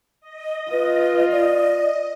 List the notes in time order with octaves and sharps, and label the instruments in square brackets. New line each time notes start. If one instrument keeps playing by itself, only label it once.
[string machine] D#5
[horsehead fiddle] F4 [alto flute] B4
[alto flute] D5